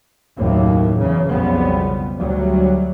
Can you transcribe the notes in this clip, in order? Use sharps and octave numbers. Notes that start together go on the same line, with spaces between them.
F#1 D#2 A2 A#3
E2 C#3
B1 F2 C#3 G3 B3
D2 F#3 G3